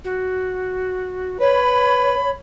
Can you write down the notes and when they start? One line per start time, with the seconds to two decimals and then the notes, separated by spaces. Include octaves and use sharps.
0.05 F#4
1.40 B4 C#5 B5